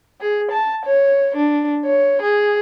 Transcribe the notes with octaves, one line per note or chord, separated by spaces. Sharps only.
G#4
A5
C#5
D4
C#5
G#4